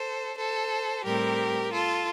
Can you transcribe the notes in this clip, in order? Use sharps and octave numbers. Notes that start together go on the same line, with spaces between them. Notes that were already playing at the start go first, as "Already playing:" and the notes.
Already playing: A4 C5
A4 C5
A2 G3 C4 G4 A#4
F4 A4